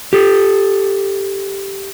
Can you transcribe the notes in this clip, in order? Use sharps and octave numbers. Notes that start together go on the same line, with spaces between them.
G4 A4